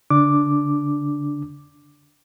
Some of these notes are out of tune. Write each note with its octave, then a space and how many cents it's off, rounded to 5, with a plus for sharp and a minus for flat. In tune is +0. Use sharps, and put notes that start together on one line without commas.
D3 -40 D4 -5 D6 +0